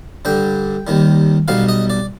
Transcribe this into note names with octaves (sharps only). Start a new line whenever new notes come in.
G2 D3 G3 G5
D#2 D#3 G3
B1 B2 G3 F5
D#5
D5